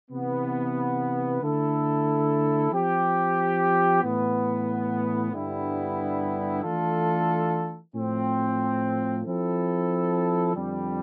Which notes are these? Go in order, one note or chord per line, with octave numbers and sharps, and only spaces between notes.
C3 E3 B3
D3 A3 E4 A4
F3 C4 G4
A2 E3 B3
G2 D3 G3 B3 E4
E3 A3 D4 F4 A4
A2 F3 C4
F3 C4 E4 A4
F2 D3 G3